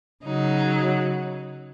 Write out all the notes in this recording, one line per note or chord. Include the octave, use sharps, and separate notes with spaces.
C#3 F#3 D#4